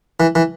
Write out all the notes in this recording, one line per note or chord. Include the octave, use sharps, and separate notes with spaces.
E3
E3